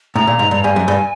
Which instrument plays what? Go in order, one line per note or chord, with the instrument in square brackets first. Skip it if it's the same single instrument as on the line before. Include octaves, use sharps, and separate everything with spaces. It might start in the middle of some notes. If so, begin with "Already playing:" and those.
[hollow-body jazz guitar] A2 [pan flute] A#5
[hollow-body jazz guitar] A#2
G#2
G2
[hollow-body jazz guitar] G2 [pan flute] G#5
[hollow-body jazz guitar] F#2
G2